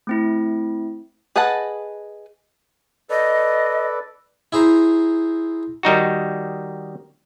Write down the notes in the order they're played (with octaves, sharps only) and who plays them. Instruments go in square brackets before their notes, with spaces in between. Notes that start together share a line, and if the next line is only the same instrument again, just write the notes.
[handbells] A3 C4 E4
[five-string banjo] G#4 B4 D#5 F#5 A5
[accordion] A4 B4 D5 [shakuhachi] D#5
[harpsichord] E4 G#4 C5 A#5
[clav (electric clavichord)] D#3 G3 D#4 F#4